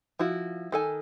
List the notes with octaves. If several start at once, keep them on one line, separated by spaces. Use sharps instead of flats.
F3 E4 F#4
D#3 A4 G#5